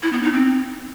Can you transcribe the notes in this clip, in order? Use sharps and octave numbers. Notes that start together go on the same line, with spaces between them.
E4
B3
D#4
C4